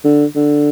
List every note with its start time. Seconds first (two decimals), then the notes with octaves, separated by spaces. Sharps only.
0.04 D3
0.35 D3